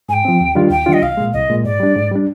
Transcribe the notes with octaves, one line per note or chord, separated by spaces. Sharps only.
G#2 G5 G#5
F3 C4
D#2
D#3 G3 D4 F4
D#2 G5
D#3 G3 D4 F4
D#5
C2 F5
A#2 G#3
C2 D#5
A#2 G#3
G#2 D5
G3 D4
G#2
G3 D4